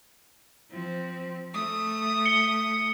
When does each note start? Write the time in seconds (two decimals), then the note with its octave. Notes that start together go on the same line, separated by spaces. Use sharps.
0.71 F3 C4
1.54 A3 D#6
2.25 C#7 G7